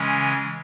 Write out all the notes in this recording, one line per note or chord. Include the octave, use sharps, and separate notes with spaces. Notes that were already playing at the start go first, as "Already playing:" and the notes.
Already playing: C#3 E3 G#3 C#4